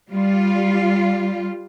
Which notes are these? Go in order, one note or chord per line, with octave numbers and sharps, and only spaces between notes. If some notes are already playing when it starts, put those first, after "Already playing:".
G3 F4